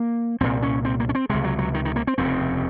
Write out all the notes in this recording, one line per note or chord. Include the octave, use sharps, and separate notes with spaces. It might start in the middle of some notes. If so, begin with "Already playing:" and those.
Already playing: A#3
C2 A#2 C4
C#4
C4
A#3
C#4
C4
C#2 C3 G#3
F#3
F#3
D#3
D#3
A#3
C4
F1 D#2 C#3 C4